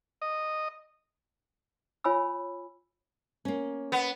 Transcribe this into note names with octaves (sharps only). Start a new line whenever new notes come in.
D#5
F4 C#5 G#5 B5 E6
A#3 C#4
B3